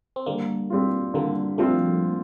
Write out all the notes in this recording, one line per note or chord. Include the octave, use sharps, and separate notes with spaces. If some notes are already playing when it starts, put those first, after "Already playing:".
C4
D3 G3 A#3
G3 C4 F4
D3 G3 A#3
F3 G3 A3 C4 F4